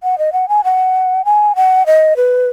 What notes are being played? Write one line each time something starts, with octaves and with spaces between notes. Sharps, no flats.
F#5
D#5
F#5
G#5
F#5
G#5
F#5
D#5
B4